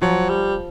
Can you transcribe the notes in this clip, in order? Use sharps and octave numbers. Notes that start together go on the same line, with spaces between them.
F3 F#3
G3